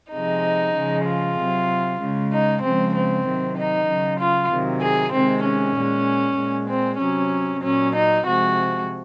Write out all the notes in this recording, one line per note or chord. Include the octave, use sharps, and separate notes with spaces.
C3 F3 G#3 D#4
C#3 F3 G#3
F4
C3 F#3
C#3 G#3
D#4
C#3 F3 G#3 C4
C4
C3 D#3 F#3
D#4
C#3 F#3
F4
C3 D#3 F#3
G#4
C3 D#3 G#3 C4
C#4
A#2 G#3
A#2 G#3
C4
C3 F#3 C#4
A#2 F#3 C#4
D#4
C3 F3 G#3 F#4